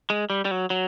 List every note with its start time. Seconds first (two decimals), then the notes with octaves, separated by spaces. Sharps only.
0.10 G#3
0.30 G3
0.45 G3
0.51 F#3
0.70 F#3